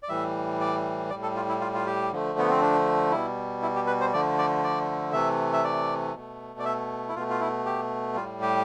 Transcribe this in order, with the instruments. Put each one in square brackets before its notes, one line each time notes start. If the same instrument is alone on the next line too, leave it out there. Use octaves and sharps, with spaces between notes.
[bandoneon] D5
A2 E3 G3 E5
D5
A2 G3 D5
A4
F4
E4
F4
F4
G4
D3 F3 A3
B3
C4
D4
B2 G3 E4
E4
G4
B4
C5
D3 F3 A3 D5
D5
D5
C3 E3 A3 E5
E5
D5
B2 A3
D5
E5
E4
B2 A3 F4
F4
E4
G4
G3 F4
A2
G4